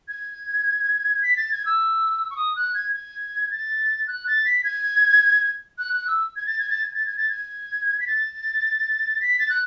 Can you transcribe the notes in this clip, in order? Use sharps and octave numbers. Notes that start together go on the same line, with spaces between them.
G#6
B6
A6
G#6
E6
C#6
D#6
F#6
G#6
G#6
A6
F#6
A6
B6
G#6
F#6
F#6
E6
G#6
A6
G#6
A6
G#6
A6
G#6
A6
G#6
B6
A6
B6
A6
F#6